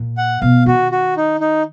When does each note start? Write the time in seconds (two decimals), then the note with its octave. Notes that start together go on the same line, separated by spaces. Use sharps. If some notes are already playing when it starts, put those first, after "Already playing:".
Already playing: A#2
0.17 F#5
0.41 B2 F5
0.66 D#3 F#4
0.92 F#4
1.17 D#4
1.40 D#4